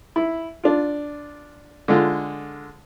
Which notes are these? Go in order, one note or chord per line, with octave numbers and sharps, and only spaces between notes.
E4
D4 F4
D3 G#3 F4